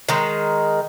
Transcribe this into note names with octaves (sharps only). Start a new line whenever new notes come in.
D#3 G#3